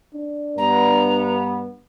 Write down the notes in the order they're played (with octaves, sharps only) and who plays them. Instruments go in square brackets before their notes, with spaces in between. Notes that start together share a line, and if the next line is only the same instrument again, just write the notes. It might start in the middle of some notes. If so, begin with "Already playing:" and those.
[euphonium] D4
[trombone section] G2 B3 [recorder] A#5